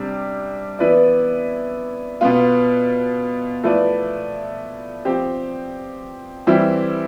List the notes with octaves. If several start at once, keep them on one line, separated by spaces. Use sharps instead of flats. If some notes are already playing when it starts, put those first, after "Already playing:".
Already playing: C3 G3 D4
E3 B3 E4 B4 D5
B2 B3 F4
F3 A3 E4 B4 D5
F3 C4 G4
E3 G3 C4 E4